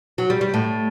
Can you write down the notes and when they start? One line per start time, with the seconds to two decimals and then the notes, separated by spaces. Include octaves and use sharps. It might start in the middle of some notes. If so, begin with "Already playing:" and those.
0.18 F#3
0.30 G3
0.41 G3
0.54 A2